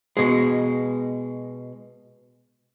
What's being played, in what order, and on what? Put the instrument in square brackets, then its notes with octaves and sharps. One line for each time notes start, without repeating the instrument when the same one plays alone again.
[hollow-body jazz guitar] B2 G#3